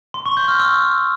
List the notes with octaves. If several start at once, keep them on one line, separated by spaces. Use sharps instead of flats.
C6
C#6
G6
F6
E6